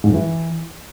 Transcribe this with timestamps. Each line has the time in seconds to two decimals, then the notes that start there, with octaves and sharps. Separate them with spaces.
0.04 G#2
0.09 F#2
0.14 E3